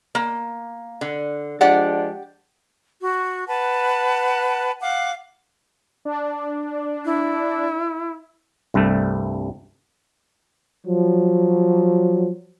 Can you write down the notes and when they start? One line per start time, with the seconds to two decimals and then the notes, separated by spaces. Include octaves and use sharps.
0.15 A#3
1.01 D3
1.61 F3 G#3 D4 G4 D5 F#5
3.00 F#4
3.47 B4 F#5 A5
4.80 F5 F#5 D6
6.05 D4
7.05 E4
8.74 C2 G2 G3 A3
10.86 F3 F#3